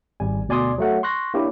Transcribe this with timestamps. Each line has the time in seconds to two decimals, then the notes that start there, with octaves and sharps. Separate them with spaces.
0.20 G#1 G3 G#5
0.48 D2 B2 D5 G#5 C6 D#6
0.78 F#3 A3 F#5
1.03 C6 C#6 F#6 A#6
1.34 A#3 D4 E4 G4 C#5